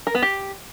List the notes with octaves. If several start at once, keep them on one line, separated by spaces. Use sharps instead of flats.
A#4
B3
G4